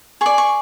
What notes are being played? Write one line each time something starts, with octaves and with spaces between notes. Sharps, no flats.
G#4 D5 C#6
C#6